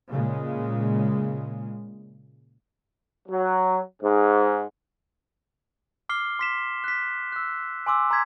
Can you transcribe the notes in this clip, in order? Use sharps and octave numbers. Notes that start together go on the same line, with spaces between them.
A#2 C#3 G#3
F#3
G#2
D6 F6 C7 G7
C6 B6 E7
F#6 B6
E6 F#6
G#5 C6 D6 E6
A#5 C6 E6 G#6 B6